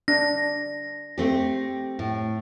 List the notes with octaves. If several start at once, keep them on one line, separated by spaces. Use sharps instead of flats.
D4 A#6
A3 C4 G4
A2